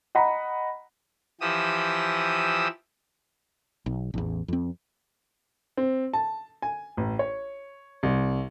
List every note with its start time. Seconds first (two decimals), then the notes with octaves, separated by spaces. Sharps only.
0.15 D#5 F#5 A#5 B5
1.41 E3 F3 G4 D#6 E6
3.86 B1
4.14 A1 E2
4.48 F2 C4
5.77 C4
6.13 A5
6.62 G#5
6.97 A1
7.19 C#5
8.03 C2